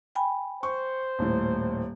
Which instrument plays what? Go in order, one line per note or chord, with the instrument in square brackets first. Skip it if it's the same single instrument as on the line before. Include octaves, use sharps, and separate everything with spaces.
[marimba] G5 G#5 B5
[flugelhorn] C5 [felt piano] C#6
[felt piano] D#1 A2